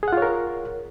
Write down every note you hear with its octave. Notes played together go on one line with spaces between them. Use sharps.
F4 G#4 A#4 C#5 F#5